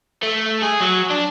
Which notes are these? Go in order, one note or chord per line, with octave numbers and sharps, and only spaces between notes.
A3
G#4
F#3
D4